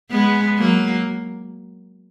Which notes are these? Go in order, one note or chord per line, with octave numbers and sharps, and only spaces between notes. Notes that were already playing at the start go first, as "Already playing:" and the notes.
G#3 B3
F#3 A#3